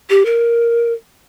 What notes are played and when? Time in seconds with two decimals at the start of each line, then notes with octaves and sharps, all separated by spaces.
0.10 G4
0.26 A#4